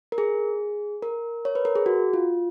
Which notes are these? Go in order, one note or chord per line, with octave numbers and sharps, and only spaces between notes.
A#4
G#4
A#4
C#5
B4
A#4
G#4
F#4
F4